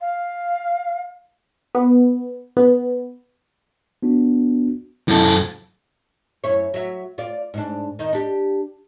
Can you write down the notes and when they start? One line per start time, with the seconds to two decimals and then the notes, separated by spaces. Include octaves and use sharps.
0.01 F5
1.75 B3
2.57 B3
4.03 B3 D4 F#4
5.08 F#2 C3 E4 A4
6.44 F#2 E4 C#5
6.74 F#3 E5
7.18 F4 D5
7.54 G#2 D4
7.99 D#3 D#4
8.13 D4 G4